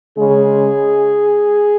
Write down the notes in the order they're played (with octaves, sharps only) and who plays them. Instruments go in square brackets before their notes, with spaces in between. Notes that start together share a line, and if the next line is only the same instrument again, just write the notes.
[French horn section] C#3 G#3 C#4 G#4